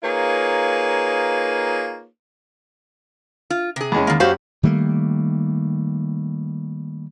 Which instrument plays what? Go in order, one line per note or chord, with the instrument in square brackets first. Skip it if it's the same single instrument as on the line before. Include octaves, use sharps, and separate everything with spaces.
[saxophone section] A#3 D#4 F4 G#4 B4 C#5
[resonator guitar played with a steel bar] F4
C3 G#4
[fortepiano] E2 G#3 C#4
[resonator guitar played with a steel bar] D#3 A#3
[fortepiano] F#2 G4 [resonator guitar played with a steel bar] F#4 C5 F5
[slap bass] D#3 G3 A3 A#3